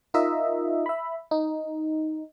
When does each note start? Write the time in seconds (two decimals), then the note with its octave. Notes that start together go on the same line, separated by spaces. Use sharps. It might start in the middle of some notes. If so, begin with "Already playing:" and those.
0.14 D#4 F4 A#4 D#5 E5
0.86 E5 B5
1.31 D#4